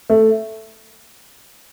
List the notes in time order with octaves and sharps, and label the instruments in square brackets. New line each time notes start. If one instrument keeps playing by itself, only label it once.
[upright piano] A3